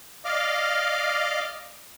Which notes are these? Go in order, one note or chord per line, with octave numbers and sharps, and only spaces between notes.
D5 D#5 F5 D6 F6